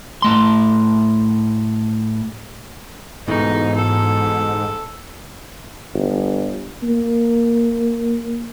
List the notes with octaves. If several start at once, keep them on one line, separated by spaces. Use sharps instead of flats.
A2 A3 C6
G#2 B2 E3 A3 D#4
A4
G1
A#3